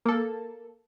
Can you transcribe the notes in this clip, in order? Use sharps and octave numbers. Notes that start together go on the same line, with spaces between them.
A#3 A4